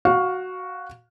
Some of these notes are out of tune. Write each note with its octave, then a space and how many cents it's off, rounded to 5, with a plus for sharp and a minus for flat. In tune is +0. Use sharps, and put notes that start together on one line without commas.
F#4 +0 F5 +20